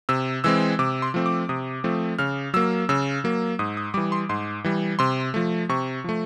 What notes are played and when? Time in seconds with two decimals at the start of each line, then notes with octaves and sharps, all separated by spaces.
0.09 C3 E6
0.44 E3 G#3 C4 E6
0.79 C3 D6
1.02 C6
1.14 F3 A3 C4
1.26 D6
1.49 C3 D#6
1.84 F3 A3 C4
2.19 C#3 F6
2.54 F#3 A#3 E6
2.89 C#3 E6
3.24 F#3 A#3
3.59 G#2 D#6
3.77 D#6
3.94 E3 G3 D6
4.12 C6
4.29 G#2 C6
4.64 E3 G3
4.99 C3 C6
5.34 F3 A3
5.69 C3 C#6
6.04 F3 A3